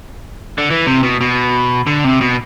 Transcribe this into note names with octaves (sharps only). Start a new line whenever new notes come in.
D3
E3
C3
B2
B2
D3
C3
B2